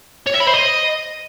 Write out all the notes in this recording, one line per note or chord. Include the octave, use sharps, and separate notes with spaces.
C#5
E5
B5
C5
D#5